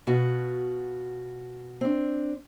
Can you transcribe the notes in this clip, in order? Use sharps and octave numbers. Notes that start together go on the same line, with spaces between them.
B2 F4 F#4
C4 D4